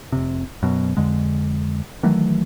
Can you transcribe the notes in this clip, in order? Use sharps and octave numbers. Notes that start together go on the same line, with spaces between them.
F1 C3
F#2 B2
F2 D3 G#3
D#3 E3 F#3 A3